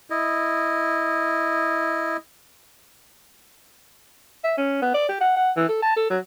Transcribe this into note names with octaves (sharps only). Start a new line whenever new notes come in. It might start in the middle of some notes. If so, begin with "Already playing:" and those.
E4 D#5
E5
C#4
B3
D5
G4
F#5
F#5
E3
A4
A5
A4
F#3